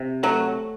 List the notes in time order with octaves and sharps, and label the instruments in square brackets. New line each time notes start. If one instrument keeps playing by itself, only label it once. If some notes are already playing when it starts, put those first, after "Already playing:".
Already playing: [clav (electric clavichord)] C3
[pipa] F#3 [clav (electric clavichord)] A3